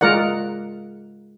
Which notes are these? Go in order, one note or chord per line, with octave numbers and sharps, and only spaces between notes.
G#3 F4 A#4 D5 F#5